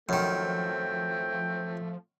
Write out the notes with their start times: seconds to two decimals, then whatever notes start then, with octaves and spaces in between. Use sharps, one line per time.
0.09 F#2 D#3 F3 A3 C4 G5